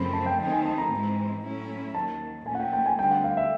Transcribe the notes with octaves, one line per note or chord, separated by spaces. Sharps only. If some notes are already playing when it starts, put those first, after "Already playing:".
Already playing: F#2 C#3 F3 A3 C4 B5
A5
G5
D#3 F#3 A3 C4 D#4 G5
G#5
A5
A#5
G#2 E3 G#3 C4
A2 F#3 A3 C#4 E4
D#2 D#3 F#3 A5
A#2 F3 A3 C#4 G#5
F#5
G5
G5
G#5
D2 D3 G3 C4 G5
F#5
F5
E5